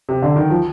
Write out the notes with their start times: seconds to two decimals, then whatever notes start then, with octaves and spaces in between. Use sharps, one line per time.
0.09 C3
0.22 D3
0.36 D#3
0.50 F3